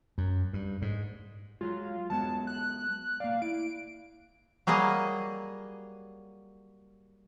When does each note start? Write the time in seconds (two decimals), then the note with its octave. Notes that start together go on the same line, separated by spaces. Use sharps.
0.18 F#2
0.53 G2
0.82 G#2
1.61 F#3 G#3 F4
2.10 F#3 G#3 B3 A5
2.47 F#6
3.20 A#3 D5 F5
3.42 E4 D7
4.67 F#3 G3 A#3 G#4 D#5